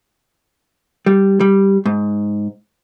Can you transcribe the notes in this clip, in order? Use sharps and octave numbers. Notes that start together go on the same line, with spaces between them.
G3
G3
G#2